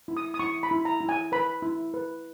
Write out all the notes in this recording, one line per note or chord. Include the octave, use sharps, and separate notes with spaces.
E4
D#6
D#6
E4 C#6
B5
E4
A#5
E4
G#5
B4 B5
E4
B4